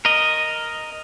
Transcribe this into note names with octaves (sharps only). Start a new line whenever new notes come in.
A#4 D#5